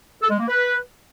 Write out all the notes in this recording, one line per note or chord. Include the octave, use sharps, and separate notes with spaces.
A4
G#3
A#3
B4